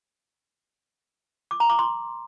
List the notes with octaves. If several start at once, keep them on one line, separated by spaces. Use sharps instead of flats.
D6
A#5
D6
C6